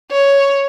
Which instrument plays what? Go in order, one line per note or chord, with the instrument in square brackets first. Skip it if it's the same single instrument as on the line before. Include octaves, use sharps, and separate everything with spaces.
[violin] C#5